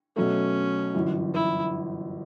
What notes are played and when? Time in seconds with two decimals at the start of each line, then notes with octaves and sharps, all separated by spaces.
0.16 B2 F#3 A3 C#4
0.95 G1 F#2 E3
1.34 E4